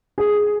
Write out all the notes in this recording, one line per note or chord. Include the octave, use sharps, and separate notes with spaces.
G#4